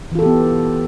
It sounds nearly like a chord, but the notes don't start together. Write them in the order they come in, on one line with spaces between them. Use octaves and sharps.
E3 F4 A4 G4 B3